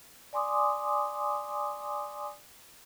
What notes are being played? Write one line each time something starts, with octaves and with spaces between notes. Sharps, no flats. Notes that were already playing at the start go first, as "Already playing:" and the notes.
D5 G#5 C6 D6 D#6